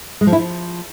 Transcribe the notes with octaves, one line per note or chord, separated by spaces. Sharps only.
G#3
F3
E4
F3